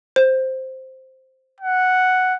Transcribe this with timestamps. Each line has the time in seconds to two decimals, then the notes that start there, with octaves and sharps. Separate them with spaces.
0.16 C5
1.61 F#5